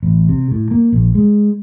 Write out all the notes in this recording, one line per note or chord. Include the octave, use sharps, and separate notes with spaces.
A1
C3
A2
A#3
A#1
G#3